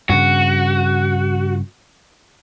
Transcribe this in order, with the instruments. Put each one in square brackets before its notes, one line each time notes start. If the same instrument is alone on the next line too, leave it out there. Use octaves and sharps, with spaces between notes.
[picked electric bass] G2 C#3 [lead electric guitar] F#4